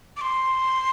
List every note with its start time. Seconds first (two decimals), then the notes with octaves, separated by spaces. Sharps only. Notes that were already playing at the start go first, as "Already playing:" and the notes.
0.17 D6
0.21 C6